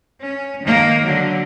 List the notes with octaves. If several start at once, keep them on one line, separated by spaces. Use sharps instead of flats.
C#4
D#3 A#3
D3 F#3